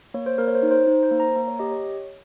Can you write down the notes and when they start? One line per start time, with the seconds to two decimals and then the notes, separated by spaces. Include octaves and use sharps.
0.14 A#3 C#5
0.26 C5
0.38 A#3 A#4
0.48 C#5
0.55 C5
0.63 D#4
0.71 C5
0.87 D#4
1.03 C5
1.11 A#3
1.20 A#5
1.36 A#3 A#5
1.48 C#5
1.59 G4 D#5
1.72 C#5